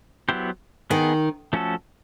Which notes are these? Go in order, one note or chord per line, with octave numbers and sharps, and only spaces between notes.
F#3 B3 E4 G4 C5
D#3 B3 D#4 G#4
F3 A3 C#4 F#4 A4